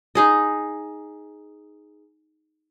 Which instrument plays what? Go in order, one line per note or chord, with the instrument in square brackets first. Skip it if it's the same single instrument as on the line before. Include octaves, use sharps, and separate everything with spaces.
[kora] D#4 G#4 D#5